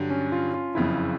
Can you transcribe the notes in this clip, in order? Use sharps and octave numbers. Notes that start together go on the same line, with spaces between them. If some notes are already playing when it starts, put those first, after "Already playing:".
Already playing: G2 D3 F#3 D4
C#4
F4
F4
F#1 F2 C#3 E4